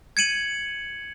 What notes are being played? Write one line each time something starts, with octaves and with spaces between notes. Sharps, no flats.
G#6 C#7 D#7 F#7